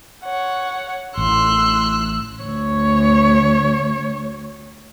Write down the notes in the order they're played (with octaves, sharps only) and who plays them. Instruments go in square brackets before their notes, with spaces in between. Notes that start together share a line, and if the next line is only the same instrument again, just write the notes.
[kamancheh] C#5 F#5
[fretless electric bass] A1 A2 [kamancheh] C6 [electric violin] E6 F#6
[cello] D2 C#5